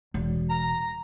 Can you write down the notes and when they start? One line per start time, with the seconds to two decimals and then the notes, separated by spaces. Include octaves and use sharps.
0.14 E1
0.50 A#5